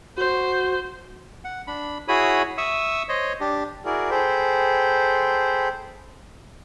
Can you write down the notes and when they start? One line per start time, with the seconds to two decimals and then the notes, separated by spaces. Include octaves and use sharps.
0.17 F#4 C5
1.44 F#5
1.67 D4 B5
2.08 E4 F#4 G#4 C#5 B5 D#6
2.58 E5 C#6 D#6 E6
3.09 C5 C#5 D#5
3.40 D4 G4
3.85 E4 F#4 G#4 A#4 D5
4.10 G#4 A4 C5 G5 B5